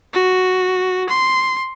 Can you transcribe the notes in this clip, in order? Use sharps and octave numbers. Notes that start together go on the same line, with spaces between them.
F#4
C6